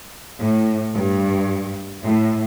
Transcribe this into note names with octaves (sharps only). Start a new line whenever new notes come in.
A2
G2
A2